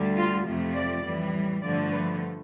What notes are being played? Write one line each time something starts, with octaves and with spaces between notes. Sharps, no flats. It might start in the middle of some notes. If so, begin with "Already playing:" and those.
Already playing: D2 D3 G3
F4
F2 C3 F3 A3
D5
A2 E3 G3
G2 D3 F3 A3 D5
B4